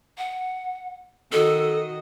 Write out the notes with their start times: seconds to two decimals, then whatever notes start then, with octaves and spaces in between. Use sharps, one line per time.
0.18 F#5
1.32 D#3 F#4 A4 D#5